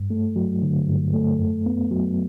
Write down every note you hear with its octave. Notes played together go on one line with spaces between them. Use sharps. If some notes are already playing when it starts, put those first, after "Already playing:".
Already playing: G2
A3
F#3
D3
G2
A3
F#2
B3
F#3